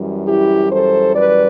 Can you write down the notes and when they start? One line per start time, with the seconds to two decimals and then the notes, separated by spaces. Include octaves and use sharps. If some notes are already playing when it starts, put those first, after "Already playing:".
Already playing: F#2 E3 G3
0.27 E4 G4
0.71 A4 C5
1.15 B4 D5